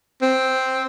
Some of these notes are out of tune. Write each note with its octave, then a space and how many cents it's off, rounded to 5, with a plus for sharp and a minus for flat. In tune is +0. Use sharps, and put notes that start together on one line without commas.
C4 +0